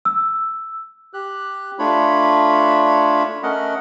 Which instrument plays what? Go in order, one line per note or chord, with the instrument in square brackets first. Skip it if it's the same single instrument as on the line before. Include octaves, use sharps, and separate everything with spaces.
[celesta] E6
[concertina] G4 F#6
A3 D4 F4 C#5 B5
A3 C#4 A#4 D#5 F#5